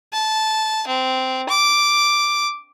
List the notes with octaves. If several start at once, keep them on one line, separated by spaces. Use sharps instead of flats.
A5
C4
D6